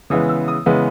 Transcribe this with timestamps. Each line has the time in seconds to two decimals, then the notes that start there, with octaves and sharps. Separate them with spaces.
0.10 C#3 E3 G#3 B3 D#6
0.29 E6
0.48 D#6
0.66 C#3 E3 G#3 B3